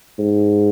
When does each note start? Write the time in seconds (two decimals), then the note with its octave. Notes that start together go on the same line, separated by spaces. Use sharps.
0.19 G#2